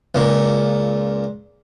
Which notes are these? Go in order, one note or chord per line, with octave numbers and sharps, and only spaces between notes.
C#2 A#2